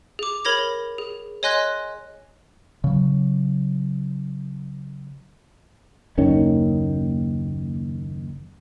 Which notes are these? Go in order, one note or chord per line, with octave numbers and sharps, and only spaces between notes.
G#4 D6
A#4 C#5 B5 G#6 A#6 F7
G#4
C#5 D#5 G#5 C6 F#6 A#6
C#3 F#3
F#1 D#2 D#3 C#4